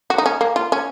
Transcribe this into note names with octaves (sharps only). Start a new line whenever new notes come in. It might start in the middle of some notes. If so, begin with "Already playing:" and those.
F#4
D#4
C#4
A#3
F4
C#4